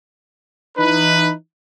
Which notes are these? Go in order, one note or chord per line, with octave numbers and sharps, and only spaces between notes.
E3 D#4 B4